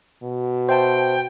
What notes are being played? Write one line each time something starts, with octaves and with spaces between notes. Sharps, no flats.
B2
C5 E5 G5 A5